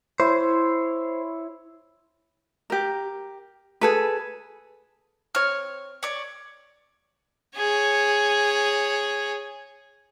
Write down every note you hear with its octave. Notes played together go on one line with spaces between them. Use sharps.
E4 C5 C#5
G4 A#4
G#4 A4 B4
C4 C#5 F6
C#5 D5
G#4 C#5